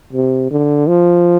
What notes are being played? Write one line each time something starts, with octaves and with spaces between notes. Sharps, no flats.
C3
D3
F3